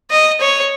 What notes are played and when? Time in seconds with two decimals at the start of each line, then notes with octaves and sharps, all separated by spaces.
0.11 D#5
0.41 C#5